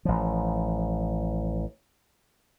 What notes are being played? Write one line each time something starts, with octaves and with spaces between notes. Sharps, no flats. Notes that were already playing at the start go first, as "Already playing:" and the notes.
A1 F3